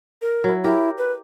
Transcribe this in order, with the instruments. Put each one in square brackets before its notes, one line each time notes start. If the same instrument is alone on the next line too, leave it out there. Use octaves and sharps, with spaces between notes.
[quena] A#4
[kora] F#3 E4
[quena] E4 [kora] G4 A#4
[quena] B4